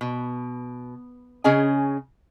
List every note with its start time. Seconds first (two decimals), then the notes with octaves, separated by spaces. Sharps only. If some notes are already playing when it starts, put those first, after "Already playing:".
0.01 B2
1.44 C#3 C#4 G#4 D#5 G#5